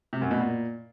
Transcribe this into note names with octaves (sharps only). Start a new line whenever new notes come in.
C3
F#2
B2
A#2